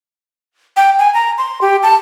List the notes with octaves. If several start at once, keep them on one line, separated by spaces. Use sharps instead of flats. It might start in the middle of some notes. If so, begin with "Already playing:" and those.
G5
G#5
A#5
C6
G4
A5